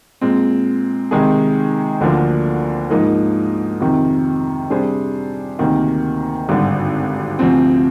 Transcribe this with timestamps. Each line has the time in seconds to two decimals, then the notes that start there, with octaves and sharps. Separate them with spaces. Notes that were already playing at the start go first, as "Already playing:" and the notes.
0.21 A#2 G#3 C4
1.11 C3 D#3 G#3 D#4 G#4
2.01 D2 D3 F3 A#3 D4
2.90 G#2 F3 A#3 D#4 A#4
3.80 F2 C3 D#3
4.70 C3 G3 D4 G#4 C5
5.59 D2 C3 D#3 A#3
6.49 G#1 G2 D3
7.39 D2 C3 F3 C4